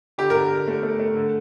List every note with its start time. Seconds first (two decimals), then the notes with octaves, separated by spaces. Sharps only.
0.18 D3 G4
0.30 A#4
0.35 D3
0.52 D3
0.67 A3
0.83 A3
0.99 A3
1.15 D3